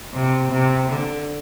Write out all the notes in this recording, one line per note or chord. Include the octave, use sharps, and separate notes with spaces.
C3
C3
D3